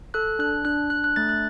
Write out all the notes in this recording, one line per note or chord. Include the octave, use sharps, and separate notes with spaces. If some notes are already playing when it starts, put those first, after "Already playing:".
A4 F#6
D4 F#6
D4 F#6
D4 F#6
F#6
A3 A6
F#6